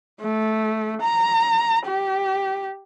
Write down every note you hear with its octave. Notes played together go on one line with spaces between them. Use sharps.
A3
A#5
G4